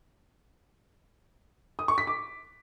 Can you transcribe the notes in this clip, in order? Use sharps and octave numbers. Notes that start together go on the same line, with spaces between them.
D#6
C#6
B6
D6